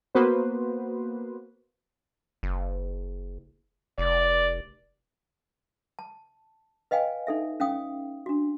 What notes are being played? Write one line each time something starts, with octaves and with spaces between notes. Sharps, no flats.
A#3 B3 F#4 B4 C5
F#1
F1 D5
A5
B4 D#5 F5 G5 G#5
D#4 A4 E5
C#4 F5 G5 D#6
D4 F#4